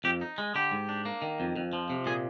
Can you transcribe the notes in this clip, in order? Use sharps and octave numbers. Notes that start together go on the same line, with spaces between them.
F2 G4
D#4
G#3
D3 G4
G#2
D4
A#3
D#3
F2
F2
F3
C3
A#2 G#4